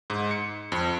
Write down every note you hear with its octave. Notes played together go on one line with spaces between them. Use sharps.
G#2
C#7
F2